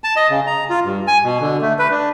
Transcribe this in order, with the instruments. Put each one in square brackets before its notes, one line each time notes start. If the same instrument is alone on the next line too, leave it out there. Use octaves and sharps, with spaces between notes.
[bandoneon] A5
D#5
C#3
A#5
F4
G2
G#5
B2
D3
A3
B4
D4